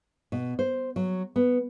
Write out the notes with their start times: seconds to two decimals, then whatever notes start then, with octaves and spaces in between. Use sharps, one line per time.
0.32 B2
0.59 C5
0.96 F#3
1.36 B3